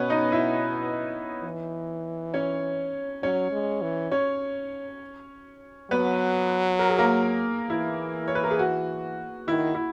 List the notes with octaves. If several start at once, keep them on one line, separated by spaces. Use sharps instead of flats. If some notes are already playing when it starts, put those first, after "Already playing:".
Already playing: B2 B3 C#4 B4 C#5
D#4 D#5
E4 E5
E3
C#4 C#5
F#3 C#4 C#5
G#3
E3
C#4 C#5
F#3 B3 B4
A#4
G#4
A#3 A#4
E3 E4
C#5
B4
A#4
G#4
F#4
D#3 E4
E4